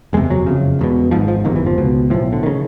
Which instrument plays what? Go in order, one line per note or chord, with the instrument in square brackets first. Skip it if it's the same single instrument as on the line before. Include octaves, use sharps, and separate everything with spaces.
[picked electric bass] F#1 E2 C3 G#3
F#3
F#1 F2 C#3
E1 E2 B2
G#1 G#2 F3
F3
G1 F2 C3 D#3
E3
F3
C#2 B2
B1 A2 F3
D3
D#3
C#3